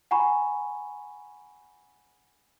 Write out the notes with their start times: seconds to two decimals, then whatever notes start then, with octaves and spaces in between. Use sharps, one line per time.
0.11 F#5 G#5 A#5 B5 C#6